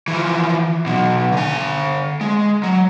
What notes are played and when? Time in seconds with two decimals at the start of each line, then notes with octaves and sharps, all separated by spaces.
0.08 E3 F3
0.86 B2 F#3
1.32 D3 G#5
2.21 G#3
2.63 F#3